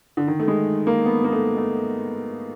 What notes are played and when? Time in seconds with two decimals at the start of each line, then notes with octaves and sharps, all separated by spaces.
0.17 D3
0.27 D#3
0.39 A3
0.48 G#3
0.87 A#3
1.06 B3
1.25 A#3
1.32 A3
1.57 A3